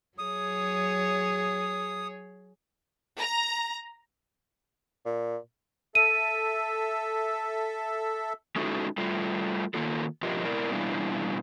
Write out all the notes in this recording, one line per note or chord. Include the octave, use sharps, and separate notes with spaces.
F#3 G#4 C#5 D#6
A#5
A#2
A4 E5 D#7
G#3 C#4 D#4 E4 F#4 A4
G3 A3 F4
D#3 A#3 F4 A4
G2 F3 F4 G4 A#4 D#5
B2 E4 A#4 D5
B2 E3 G3 D4 E4 F4